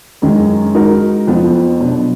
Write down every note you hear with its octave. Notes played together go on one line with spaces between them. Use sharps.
F#2 D#3 G#3
G#3 D#4 F#4 A#4
F2 F3 B3
B2 F#3 D4